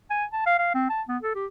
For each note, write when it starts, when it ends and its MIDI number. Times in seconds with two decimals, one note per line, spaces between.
0.10 0.25 80
0.33 0.42 81
0.46 0.57 77
0.59 0.73 77
0.75 0.85 60
0.90 1.02 81
1.09 1.17 59
1.23 1.35 69
1.35 1.46 67